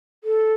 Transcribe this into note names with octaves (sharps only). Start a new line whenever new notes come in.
A4